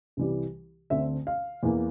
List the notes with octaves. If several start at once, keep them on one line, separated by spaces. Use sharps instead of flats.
C2 C3 E3 G3
D2 D3 A3 C4 E5
F5
E2 E3 A#3